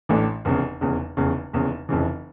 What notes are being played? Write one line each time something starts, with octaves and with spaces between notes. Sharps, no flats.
A1 A2 E3 A3 D4
F1 E2 C#3
F1 E2 C#3
F1 E2 C#3
F1 E2 C#3
F1 F2 C#3 E3